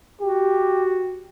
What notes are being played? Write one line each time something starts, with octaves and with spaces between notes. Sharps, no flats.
F#4 G4